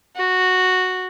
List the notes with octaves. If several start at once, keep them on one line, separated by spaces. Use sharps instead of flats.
F#4